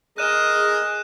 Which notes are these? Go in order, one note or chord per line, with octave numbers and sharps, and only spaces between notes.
G#4 A#4 D#5 F#6 D#7 E7